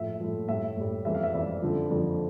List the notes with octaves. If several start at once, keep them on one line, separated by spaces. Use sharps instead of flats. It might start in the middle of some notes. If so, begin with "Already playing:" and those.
Already playing: A2 F3 E5
A2 F3
A2 G3 E5
A2 G3
F2 E3 G3 E5
F5
E5
F2 E3 G3 D5
F2 D3 F3
F2 D3 F3